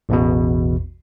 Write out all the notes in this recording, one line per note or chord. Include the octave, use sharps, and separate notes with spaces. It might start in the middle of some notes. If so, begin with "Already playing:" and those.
A1 E2 B2